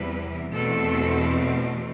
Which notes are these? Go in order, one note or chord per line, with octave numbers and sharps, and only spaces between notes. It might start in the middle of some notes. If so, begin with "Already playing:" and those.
Already playing: E2 C3 E3 G3 B4
E2 B2 A3 C4 A4